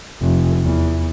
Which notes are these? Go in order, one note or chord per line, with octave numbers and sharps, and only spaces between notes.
F1
E2